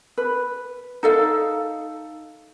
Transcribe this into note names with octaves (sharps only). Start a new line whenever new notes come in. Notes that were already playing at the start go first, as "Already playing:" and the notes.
B4
D#4 A4 F5